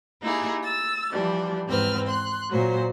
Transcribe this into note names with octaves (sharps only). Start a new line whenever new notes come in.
A#3 D#4 E4 G4 G#4
E6 A6
E3 F3 G3 D4
E2 G#2 C4 B4 F6
C6 F#6
A#2 F#3 C5